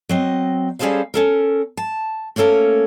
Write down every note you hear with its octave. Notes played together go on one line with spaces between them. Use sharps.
F#3 C4 D#5
G3 C#4 G#4 A4 C5 F5
C#4 A4 A#4
A5
A3 A#3 C#4 A4 A#4